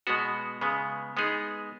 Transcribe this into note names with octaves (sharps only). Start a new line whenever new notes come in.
B2 G#3 B3 F#4
C#3 G#3 B3
G#3 B3 D#4 G#4